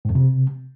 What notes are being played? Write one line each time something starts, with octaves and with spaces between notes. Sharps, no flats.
G#2
F2
C3